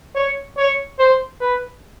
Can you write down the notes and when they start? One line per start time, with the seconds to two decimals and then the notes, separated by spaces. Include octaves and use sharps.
0.15 C#5
0.57 C#5
0.99 C5
1.41 B4